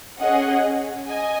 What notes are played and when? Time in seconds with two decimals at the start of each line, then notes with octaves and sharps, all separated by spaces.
0.20 C#4 G#4 D#5 F#5
1.08 D#5 G#5